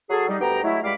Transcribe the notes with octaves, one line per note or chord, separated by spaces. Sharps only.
F#3 G#4 A4
G3 D#4
D2 B3 G4 G5 A#5
F#3 G#3 A3 E4
C#2 G3 G#3 F5 B5 D6